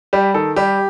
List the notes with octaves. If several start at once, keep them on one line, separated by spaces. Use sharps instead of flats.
G3 G4
D#3 A4
G3 G4